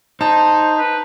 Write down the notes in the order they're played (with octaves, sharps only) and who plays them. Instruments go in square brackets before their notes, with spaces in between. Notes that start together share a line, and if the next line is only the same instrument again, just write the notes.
[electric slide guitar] D#4 [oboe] C5 [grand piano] A5
[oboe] B4